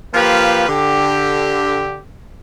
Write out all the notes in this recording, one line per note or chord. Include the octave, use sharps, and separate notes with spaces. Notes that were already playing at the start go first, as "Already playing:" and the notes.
F3 A#3 F4 G4 B4
D3 G4